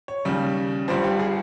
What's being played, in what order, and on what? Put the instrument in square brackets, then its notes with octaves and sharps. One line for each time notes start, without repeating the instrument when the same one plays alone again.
[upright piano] C#5
D#2 C#3 G3
G1 G2 G3 C5
G4
G#4